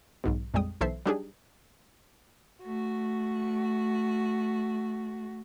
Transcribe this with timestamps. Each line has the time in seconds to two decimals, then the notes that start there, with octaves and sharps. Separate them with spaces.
0.24 B1 G#2 B2
0.54 A#1 F2 G3 G#3 G5 D#6
0.81 B1 E3 A4 C5 E5 C7
1.06 F#3 G3 D4 D#4 G4 G#4
2.64 A3 F#4